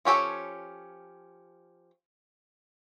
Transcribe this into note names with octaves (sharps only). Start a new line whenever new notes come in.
F3 C#4 G4 A4 C#5